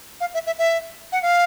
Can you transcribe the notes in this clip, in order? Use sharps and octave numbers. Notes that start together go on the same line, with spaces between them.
F5
E5
E5
E5
F#5
F5